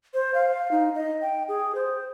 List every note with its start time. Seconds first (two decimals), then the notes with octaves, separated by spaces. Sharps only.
0.14 C5
0.34 F5
0.71 D#4
0.95 D#5
1.22 G5
1.48 G#4
1.75 C5